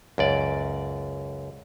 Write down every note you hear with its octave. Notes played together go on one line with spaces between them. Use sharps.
C#2 F#2 D5